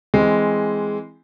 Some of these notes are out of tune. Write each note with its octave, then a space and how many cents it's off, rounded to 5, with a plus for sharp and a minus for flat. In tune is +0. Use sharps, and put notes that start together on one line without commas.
E3 +0 G#3 +0 C4 +0